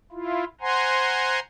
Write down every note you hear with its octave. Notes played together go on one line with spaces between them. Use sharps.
E4 F4
C5 F#5 G#5 A#5 C6